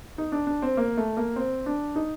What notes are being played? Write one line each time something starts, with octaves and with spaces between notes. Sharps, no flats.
D#4
D4
D4
C4
A#3
A3
A#3
C4
D4
D#4